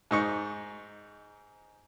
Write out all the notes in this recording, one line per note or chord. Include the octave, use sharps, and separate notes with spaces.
G#2 D#4 C#6